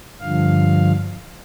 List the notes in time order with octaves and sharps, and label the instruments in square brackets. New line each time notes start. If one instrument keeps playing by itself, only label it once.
[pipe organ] G2 D3 F3 F5